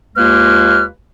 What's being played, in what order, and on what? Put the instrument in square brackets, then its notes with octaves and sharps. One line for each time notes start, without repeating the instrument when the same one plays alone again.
[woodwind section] D#2 G#3 A#3 F4 B4 F6